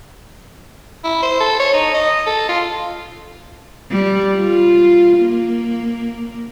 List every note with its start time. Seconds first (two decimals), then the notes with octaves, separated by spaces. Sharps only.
1.04 E4
1.23 C5
1.40 A4
1.60 C#5
1.74 D#4
1.94 D#5
2.26 A4
2.49 F4
3.91 G3
4.36 F4
5.19 A#3